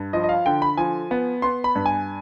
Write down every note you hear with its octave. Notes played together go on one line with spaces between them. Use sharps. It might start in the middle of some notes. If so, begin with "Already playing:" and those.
Already playing: G2
F3 D#5
D#5
F5
D3 G5
B5
F3 G#5
B3
B3 C6
B5
G2
G#5